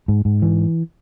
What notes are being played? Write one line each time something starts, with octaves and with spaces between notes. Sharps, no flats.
G#2
G#2
E3